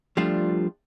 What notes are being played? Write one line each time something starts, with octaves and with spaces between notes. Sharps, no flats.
F3 G3 A3 D4 F4